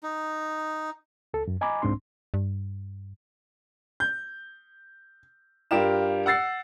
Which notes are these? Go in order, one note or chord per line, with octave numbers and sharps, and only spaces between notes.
D#4
C#2 A4
F#2
D#5 G#5 A#5 B5 D6
C2 G#2 C4 D4 C6
G2
G6
G2 F4 G4 A#4 F5 E7
F#5 E6 A6 C7